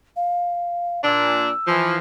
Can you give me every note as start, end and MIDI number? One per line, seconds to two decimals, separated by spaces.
0.16 1.02 77
1.04 1.51 46
1.04 1.51 62
1.04 1.72 88
1.67 1.98 52
1.67 1.98 53